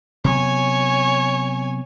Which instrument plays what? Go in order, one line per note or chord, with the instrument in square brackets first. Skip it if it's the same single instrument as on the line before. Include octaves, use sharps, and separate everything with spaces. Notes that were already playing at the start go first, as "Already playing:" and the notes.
[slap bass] C3 F#3 B3 [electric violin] C#5 G#5